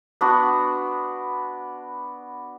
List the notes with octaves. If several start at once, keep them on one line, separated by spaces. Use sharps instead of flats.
B3 D4 F#4